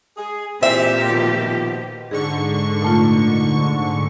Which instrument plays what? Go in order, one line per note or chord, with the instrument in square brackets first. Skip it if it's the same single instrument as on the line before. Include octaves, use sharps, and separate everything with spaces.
[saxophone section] G#4
[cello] A#2 G4 [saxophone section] E3 C4 [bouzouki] E5
[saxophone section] B2 D#3 F3
[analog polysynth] G#2 D3 C#6 [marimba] G#4
[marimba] A#2 A3 F4